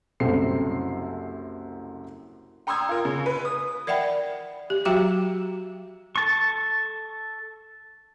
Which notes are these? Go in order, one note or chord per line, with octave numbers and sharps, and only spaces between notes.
F#1 C2 F#2 C4 A4 C7
G5 A#5 C6 D#6 E6 G#6
F4 A#4
C#3
B4
D#6
A#4 D5 E5 F#5 G5 B5
G4
F#3 F#4 E5 G5 A#5 D6
A4 A5 C#6